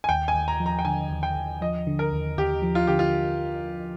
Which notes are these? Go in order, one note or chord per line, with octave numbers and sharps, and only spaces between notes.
G#5
D#2 G5
G#5
D#2
A#5
F3
A#5
G5
D3 G#5
D#2
G5
D#2
F3 D#5
D3
A#4
D#2
D#2 G4
F3
F4
D3 G4
F4